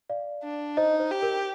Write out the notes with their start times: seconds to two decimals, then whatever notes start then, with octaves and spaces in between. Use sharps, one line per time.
0.10 D5 F5
0.44 D4
0.77 D#4 C5 D#5
1.00 C5
1.11 G4
1.23 A#4